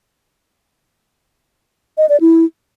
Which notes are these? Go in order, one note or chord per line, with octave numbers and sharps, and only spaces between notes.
D#5
D5
E4